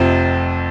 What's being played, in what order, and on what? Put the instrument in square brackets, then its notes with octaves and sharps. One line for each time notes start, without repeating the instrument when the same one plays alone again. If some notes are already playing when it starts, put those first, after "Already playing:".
Already playing: [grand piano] F1 F2 C3 F3 C4